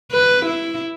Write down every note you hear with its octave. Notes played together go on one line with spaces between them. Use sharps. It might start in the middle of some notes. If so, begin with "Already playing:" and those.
B4
E4